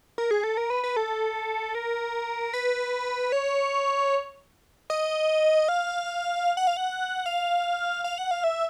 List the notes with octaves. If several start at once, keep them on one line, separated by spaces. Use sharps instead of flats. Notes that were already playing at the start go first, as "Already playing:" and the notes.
A#4
G#4
A4
A#4
B4
B4
A4
A#4
B4
C#5
D#5
F5
F#5
F5
F#5
F5
F5
F#5
F5
E5